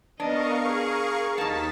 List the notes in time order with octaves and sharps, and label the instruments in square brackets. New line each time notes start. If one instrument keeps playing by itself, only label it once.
[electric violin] B3 D#5 [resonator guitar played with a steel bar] D4 [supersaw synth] A#4 F5 C#6
[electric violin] G#4
[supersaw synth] D#2 A6 B6 [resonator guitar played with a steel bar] A#3 D#4 [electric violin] A5